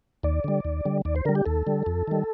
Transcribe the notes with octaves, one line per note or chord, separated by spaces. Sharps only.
D#2 D5
D3 G3
D#2
D3 G3
D#2 D5
C5
D3 G3 A#4
G4
D#2 A4
D3 G3
F2
D#3 G3